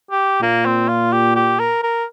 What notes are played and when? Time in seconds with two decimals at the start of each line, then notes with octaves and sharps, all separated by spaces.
0.11 G4
0.41 A#2 A#3
0.66 C4
0.88 F4
1.12 G4
1.36 G4
1.59 A#4
1.83 A#4